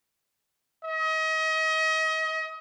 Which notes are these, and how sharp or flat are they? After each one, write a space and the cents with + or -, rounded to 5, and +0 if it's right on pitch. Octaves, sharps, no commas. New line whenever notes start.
D#5 +35